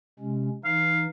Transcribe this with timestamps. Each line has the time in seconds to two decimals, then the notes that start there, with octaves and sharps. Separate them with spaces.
0.19 C3 G#3 C#4
0.65 E3 D#4 F5